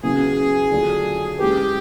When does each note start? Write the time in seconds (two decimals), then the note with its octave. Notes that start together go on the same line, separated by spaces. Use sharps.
0.03 C#3 F#3 B3 E4 G#4
0.71 D3 F#3 A3 D4 F4
1.39 G#3 C#4 E4 G4 G#4 B4